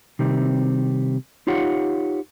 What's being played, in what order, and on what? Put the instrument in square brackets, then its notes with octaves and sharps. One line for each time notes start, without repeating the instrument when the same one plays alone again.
[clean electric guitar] C3 D#3 G3 C4
D#4 F4 G4 C#5 F5 F#5